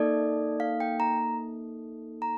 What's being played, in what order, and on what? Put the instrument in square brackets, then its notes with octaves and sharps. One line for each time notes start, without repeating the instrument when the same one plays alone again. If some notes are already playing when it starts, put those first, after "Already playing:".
Already playing: [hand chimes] A#3 D#4 A4 D5
F5
G5
A#5
A#5